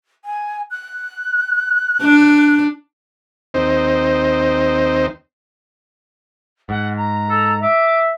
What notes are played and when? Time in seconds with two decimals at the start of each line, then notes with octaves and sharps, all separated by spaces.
0.25 G#5
0.71 F#6
2.01 D4
3.54 D#2 C4 D#4 C5
6.69 G#2 F#5
6.97 A#5
7.29 A4
7.62 E5 D6